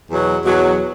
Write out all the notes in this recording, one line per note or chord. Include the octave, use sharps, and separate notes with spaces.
E2 B2 F#3
E2 B2 F#3